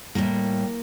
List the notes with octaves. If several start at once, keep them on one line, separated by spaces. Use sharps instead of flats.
A2 G3 A#3